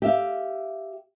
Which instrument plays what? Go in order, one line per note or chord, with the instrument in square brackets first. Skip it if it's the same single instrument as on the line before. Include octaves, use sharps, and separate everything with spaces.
[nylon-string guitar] G4 E5 F5